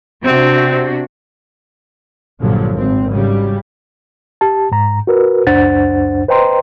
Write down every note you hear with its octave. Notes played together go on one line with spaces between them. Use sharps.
C3 C4 D4 F#4
A#1 G2 A#2 D3 F3 F#3
G#1 C4
G#2 C#3 F#3 G3
G4 A5
G#2 A#5
F#4 A#4 B4
C#2 F#2 D4 C5 F#5 A6
B4 C5 D#5 G5 A#5 C6